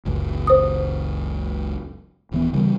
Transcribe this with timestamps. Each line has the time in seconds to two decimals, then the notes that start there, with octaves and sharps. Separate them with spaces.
0.05 F#1 C#2 F#2
0.47 C5 D#6
2.32 D1 E3 B3
2.53 C#3 E3 G3